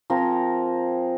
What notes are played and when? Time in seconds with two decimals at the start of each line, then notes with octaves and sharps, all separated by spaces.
0.10 F3 C4 G#4 A#4